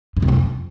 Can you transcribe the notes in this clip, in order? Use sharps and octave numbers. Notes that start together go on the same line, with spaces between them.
G2
C3
F2